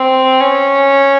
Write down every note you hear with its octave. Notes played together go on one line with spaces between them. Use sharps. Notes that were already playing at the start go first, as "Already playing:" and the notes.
Already playing: C4
C#4